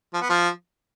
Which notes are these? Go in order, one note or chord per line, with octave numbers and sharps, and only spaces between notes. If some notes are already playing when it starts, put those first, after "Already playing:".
F3
B3
F3